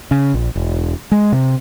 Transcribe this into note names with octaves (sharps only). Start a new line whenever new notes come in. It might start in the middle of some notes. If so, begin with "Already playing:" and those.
C#3
A#1
E1
G#3
C3